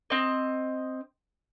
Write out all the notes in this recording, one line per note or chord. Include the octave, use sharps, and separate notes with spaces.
C4 D#5